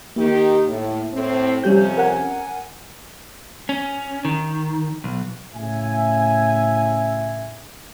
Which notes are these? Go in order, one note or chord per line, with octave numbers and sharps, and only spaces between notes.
D#3 A#3 D#4 G4
A2
A2 C4
F2 C3 G3 C#4 G4 G6
A#4 F#5 G#5
C#4
D#3
B1
A2 C#3 E5 G#5